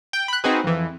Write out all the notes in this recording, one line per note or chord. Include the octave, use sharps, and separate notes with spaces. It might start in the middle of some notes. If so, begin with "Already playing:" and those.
G5
B5 F#6
C4 D#4 F#4 G#4 B4
F2 E3